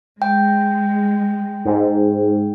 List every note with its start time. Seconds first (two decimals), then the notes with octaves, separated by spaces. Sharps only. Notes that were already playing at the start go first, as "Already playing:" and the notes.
0.22 G#3 G5
1.65 G#2